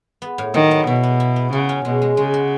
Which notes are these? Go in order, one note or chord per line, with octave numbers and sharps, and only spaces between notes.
B3
A2
D#3 F#3
B3
B2 E4
B3
E4
B3
C#3 F#4
C#4
B2 G#3
G#3
C#3 G#3
F#4